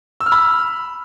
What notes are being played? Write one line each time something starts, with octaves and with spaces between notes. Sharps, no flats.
E6
F6
B5